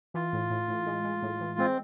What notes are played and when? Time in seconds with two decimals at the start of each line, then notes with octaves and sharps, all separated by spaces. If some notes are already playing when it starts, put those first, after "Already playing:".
0.14 E3 F4
0.33 A2
0.50 A2
0.68 A2
0.86 G#3
1.04 G#3
1.23 A2
1.41 E3
1.58 G#3 C4